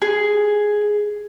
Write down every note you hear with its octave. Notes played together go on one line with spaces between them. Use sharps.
G#4